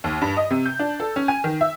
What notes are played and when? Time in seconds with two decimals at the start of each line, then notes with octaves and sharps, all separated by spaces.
0.04 D#2
0.21 G2
0.37 D#5
0.50 C3
0.66 G6
0.79 D4
1.00 A4
1.16 C#4
1.28 G#5
1.44 D#3
1.61 E5